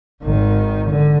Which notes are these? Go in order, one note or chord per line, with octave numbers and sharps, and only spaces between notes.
G#1 D#3
D3